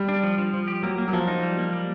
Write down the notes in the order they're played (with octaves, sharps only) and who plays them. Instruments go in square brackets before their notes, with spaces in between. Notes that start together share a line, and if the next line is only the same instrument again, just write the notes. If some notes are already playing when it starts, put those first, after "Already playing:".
Already playing: [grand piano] G3
[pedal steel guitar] D4
F3
F3
F3
G4
[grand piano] F#3 [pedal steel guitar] A#3
[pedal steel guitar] A#3
[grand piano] F#3
[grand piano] F3 [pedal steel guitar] A#3
[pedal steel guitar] D#4
G3
A#3
G3